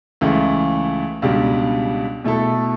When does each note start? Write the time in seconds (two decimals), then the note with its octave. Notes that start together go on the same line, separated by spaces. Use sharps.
0.21 C#2 C#3 E3 A3
1.22 C#2 B2 G3 D4
2.24 B2 A3 E4 A4